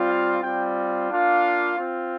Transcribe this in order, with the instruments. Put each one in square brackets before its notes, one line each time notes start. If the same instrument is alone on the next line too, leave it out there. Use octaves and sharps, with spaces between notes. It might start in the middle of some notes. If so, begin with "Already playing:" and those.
Already playing: [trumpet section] G3 C4 F4
F5
G3 C4 F4 G5
A#3 D4 F4 F5
C4 F4